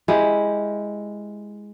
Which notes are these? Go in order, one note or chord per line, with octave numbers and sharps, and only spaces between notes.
G#3 E4 G4